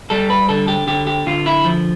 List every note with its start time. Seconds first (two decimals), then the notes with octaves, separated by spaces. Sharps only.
0.10 G3 A4
0.30 B4
0.49 D3 A4
0.68 G4
0.87 D3 G4
1.07 G4
1.27 D3 F4
1.46 E4
1.65 F3